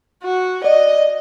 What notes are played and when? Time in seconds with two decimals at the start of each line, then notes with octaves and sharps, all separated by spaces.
0.24 F#4
0.64 D5 D#5